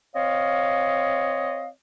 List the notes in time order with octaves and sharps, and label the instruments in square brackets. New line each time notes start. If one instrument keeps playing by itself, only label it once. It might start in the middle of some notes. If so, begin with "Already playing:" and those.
[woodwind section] C4 C#5 D#5 F5